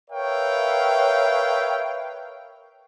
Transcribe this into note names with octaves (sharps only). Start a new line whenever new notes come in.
A#4 B4 C#5 E5 F5 G5